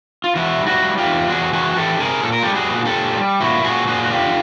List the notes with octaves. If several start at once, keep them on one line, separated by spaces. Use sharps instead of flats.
F4
E3 E4 F#4
G3
E4 F#4
G3
F4 G4
E2
E2 F#4 G#4
E3 F#4 G#4
E3 G4 A4
C3 G#4 A#4
A#2 A4
A#4
G3 G4 A4
F#4 G#4
A#2
G4 A4
A#2
G3
A#2 E4 F#4
A#2 F#4 G#4
A#2 F#4 G#4
F#4
D3 F4 G4